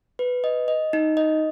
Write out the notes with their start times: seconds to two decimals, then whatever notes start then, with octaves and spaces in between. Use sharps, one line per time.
0.19 B4
0.44 D#5
0.68 D#5
0.93 D#4
1.17 D#5